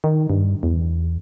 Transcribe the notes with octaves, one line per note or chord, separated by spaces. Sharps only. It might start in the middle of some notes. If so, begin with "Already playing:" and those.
D#3
G2
E2